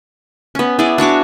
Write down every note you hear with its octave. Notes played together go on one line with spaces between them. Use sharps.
B3 C#4
B3 E4 G#4 D5
D4 F#4 C#5 D6